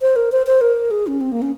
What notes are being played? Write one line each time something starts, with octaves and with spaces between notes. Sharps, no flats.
C5
A#4
C5
C5
A#4
G#4
C#4
C4
A#3
C#4